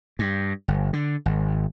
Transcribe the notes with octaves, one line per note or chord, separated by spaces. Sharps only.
G2
G1
D3
G#1